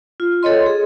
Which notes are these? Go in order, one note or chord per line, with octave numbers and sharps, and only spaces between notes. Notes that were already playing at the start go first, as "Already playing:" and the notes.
F4
A4 C#5 D#5 C6
G#4